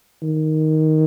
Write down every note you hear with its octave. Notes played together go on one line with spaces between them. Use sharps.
D#3